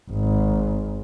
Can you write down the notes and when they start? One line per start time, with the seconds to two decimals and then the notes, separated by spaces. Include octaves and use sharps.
0.11 G#1